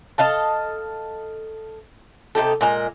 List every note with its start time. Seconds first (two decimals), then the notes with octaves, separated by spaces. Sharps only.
0.18 A4 D#5 F5 A5
2.35 C3 D#4 G4 A4
2.61 A#2 G#3 A#5